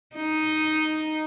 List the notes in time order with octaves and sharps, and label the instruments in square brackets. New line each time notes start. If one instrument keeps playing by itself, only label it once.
[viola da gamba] D#4